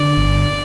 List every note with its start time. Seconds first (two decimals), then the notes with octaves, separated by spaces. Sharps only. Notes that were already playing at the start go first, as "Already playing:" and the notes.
Already playing: D3 D5
0.17 G1